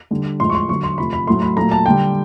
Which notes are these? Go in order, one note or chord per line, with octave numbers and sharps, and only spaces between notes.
D3 G3
A2 F3 G#3 C6
C#6
C6
D3 F#3 A3 C#6
C6
C3 F3 A3 B5
B5
A2 F#3 A3 C6
B5
A#2 F#3 A3 A#5
A5
D3 G3 G5